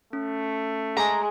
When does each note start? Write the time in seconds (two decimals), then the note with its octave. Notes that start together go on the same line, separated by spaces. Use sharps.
0.13 A3 C#4
0.97 G#3 G#4 G#5 A#5